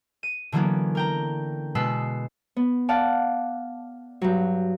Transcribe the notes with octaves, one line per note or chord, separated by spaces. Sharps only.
D#7
D3 E3 F#3 A#3 B3 C#4
A#4 G5 A#5
B2 G#3 B3 B4 E6 C7
B3
D5 F5 F#5 A5
G2 F#3